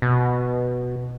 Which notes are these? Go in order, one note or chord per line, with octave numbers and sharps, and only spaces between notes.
B2